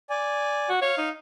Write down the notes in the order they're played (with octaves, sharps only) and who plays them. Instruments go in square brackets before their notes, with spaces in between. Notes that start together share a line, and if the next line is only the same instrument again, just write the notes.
[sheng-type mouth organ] D5 G#5
[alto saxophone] F#4
[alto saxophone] C#5 [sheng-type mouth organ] F5 F6
[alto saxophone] D#4